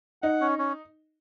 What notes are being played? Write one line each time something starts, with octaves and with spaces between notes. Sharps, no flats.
D#4 F#5
C#4
C#4